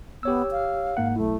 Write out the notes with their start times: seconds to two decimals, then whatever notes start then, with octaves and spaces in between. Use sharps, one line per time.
0.23 B3 G4 C#5 E6
0.51 F5
0.97 G#2 A#3 F#5
1.16 B1 A3 E4